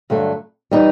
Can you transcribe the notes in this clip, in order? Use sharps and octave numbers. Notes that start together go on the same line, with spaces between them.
G2 D3 F#3 A3
E3 G3 D#4